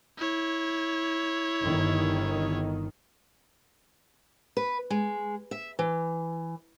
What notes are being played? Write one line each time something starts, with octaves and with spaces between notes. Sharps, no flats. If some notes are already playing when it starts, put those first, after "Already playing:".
E4 C#5
G1 D#3
B4
G#3
E5
E3